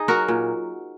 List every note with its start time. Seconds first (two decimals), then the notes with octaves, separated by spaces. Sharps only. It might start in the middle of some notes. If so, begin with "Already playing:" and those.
Already playing: D#4 G#4
0.08 F#3 F#4 A#4
0.28 A#2